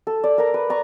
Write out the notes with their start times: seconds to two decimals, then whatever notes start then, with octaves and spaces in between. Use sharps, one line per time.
0.07 A4
0.24 D5
0.38 A#4 A#5
0.54 B4
0.70 D5 A#5 C#6